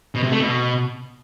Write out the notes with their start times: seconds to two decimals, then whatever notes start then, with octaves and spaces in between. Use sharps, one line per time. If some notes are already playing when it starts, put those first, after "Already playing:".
0.15 B2
0.23 C3
0.32 A3
0.40 B2